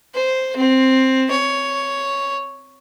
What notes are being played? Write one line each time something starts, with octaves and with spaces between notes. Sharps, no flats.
C5
C4
C#5